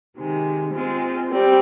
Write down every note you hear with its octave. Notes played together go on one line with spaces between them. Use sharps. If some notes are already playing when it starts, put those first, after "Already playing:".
C3 D#3 G#3
G#3 C4 F4
G3 C4 G4